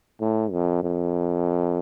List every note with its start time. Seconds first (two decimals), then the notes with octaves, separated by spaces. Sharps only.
0.20 A2
0.52 F2
0.83 F2